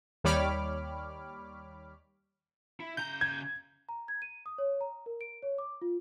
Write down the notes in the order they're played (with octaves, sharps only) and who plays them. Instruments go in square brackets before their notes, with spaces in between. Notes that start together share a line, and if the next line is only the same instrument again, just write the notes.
[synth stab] D#2 G3 C#5 B5 D6 F6
[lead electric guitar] E4
[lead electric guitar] C#3 A#5 [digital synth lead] G6
[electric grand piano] G#6
[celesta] A#5
G#6
D#7
D#6
C#5
A#5
A#4
D7
C#5
D6
F4